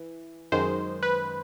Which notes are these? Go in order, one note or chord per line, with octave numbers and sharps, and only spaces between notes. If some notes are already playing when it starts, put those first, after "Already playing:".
Already playing: E3
F#2 D#3 G#3 C5
B4